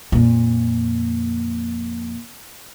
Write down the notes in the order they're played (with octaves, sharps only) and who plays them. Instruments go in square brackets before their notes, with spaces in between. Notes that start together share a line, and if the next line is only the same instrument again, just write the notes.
[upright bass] F2 A#2